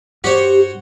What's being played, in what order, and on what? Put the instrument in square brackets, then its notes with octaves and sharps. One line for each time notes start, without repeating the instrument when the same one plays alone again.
[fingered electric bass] G2 [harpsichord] F#4 C5 C#5 [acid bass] G4